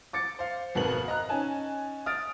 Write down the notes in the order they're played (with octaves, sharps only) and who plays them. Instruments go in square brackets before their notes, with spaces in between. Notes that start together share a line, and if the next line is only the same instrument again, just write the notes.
[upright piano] D6 A6 C#7
C5 F5
G#1 F2 B2 B3 A#4 F#7
D#5 A#5 F#6
C#4 D#4 G#5 A5
D#6 F6 A6 D7